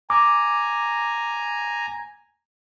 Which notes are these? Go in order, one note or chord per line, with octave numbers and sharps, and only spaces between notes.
G#5 A#5 D6